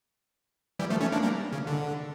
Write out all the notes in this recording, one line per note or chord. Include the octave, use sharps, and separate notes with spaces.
E3 G3
F3 A3
A3 C#4
A#3 D4
G3 A#3
C#3
D3